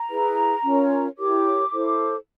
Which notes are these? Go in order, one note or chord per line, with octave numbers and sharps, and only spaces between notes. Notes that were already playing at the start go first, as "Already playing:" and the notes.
Already playing: A#5
E4 G#4 B4
C#4 F4 A#4 C#5
E4 G4 A#4 C#5 D6
E4 A4 C5